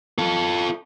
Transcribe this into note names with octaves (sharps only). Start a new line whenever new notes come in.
F4 A4